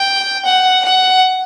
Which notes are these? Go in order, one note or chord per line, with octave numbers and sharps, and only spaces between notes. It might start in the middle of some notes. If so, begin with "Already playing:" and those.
Already playing: G5
F#5
F#5